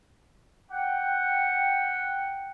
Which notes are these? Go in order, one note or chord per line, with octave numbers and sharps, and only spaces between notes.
F#5 G5